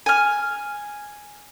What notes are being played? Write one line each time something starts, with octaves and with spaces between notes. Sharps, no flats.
G#5 F6